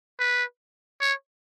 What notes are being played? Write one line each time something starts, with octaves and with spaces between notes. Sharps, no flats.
B4
C#5